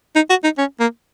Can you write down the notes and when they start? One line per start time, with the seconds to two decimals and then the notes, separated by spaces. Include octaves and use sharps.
0.16 D#4
0.30 F#4
0.44 D#4
0.58 C#4
0.80 A#3